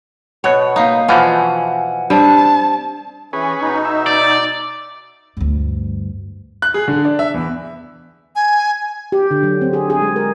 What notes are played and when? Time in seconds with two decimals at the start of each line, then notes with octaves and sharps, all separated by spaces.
0.44 B2 C#5 F#5
0.76 A#3 D#4 F5 D#6
1.09 B2 E3 F3 F4 F#5 G#5
2.10 G3 C4 D4 A5
3.33 E3 C#4 G#4 B4
3.61 B2 D#4
3.85 E5
4.06 D5
5.37 D2 G2
6.62 F#6
6.74 G#4
6.88 D3
7.05 D4
7.19 E5
7.34 E2
8.36 G#5
9.12 G4
9.31 D3
9.43 F#3
9.61 C4
9.73 G#4
9.90 G#4
10.01 G#3
10.16 A#4